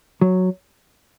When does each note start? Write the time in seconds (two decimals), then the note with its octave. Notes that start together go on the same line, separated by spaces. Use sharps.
0.21 F#3